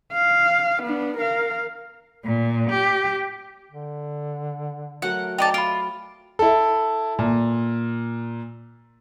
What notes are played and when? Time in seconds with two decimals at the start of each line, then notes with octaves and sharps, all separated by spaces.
0.13 F5
0.83 B3 D4
1.17 A#4 F5
2.23 A#2
2.68 G4
3.71 D3
5.02 F#3 A3 A#4 F#5
5.38 D#4 D5 G5 A5 D6
5.54 F4 B5 D7
6.39 E4 A4
7.19 A#2